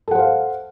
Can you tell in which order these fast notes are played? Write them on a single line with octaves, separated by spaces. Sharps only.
A4 F#5 C5 F5